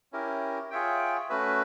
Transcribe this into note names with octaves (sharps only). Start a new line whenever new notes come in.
C#4 E4 G4 A#4
F4 G#4 C#5 E5 G5
A3 C#4 F#4 B4 E5